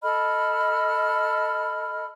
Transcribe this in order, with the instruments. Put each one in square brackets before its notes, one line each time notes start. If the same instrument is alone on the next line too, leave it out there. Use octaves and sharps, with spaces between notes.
[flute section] A4 D#5 B5 F6